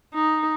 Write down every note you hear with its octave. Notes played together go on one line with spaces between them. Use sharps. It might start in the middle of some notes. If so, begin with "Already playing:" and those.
D#4